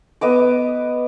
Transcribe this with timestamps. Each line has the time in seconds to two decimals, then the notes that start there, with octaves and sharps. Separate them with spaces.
0.21 B3 D#5 D6